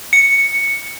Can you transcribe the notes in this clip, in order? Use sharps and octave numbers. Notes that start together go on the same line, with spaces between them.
C#7